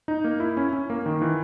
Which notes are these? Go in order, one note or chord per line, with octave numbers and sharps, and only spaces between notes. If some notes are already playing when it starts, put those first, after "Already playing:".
D#4
A#3
E4
C#4
C#4
A#3
D#3
E3